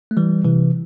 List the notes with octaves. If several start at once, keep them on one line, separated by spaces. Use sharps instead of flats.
A3
E3 G3
C3 E3